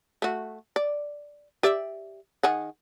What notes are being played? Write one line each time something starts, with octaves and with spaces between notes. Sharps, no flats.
A3 F#4
D5
G4 D5 E5
D#3 G#4 F#5